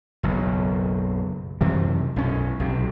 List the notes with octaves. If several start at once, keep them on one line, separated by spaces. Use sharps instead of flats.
F#1 B1
F#2 C3 E3
B1 C#4
B1 C3